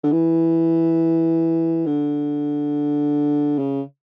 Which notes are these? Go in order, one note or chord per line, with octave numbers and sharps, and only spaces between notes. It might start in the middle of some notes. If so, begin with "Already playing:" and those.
D3
E3
D3
C#3